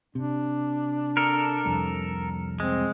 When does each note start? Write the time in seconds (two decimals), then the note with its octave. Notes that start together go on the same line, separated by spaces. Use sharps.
0.15 C3 D4
1.17 A4 A#4
1.65 F1 C2 F2
2.60 G#3 C4